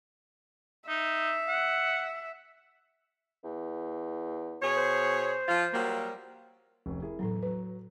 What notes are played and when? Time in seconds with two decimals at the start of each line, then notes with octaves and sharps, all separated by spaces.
0.88 D#4 E5
1.48 F#5
3.44 E2
4.62 B2 G#4 C#5
4.77 C5
5.47 F3 F4
5.73 F#3 G3 A#3
6.86 F1 C#4
7.02 E4 G#4 A#4
7.19 E2 A2 F#3 A#5
7.43 F#3 B4 A#5